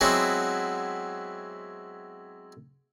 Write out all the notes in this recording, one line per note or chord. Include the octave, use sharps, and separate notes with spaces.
F#3 G#3 B3 C4 E4 F#4